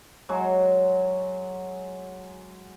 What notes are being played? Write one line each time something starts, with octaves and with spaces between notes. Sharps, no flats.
F#3 G#3 F#4